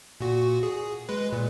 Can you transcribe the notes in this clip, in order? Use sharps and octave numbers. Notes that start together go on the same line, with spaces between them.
A#2 F#4
G#4
G#3 B4
A#2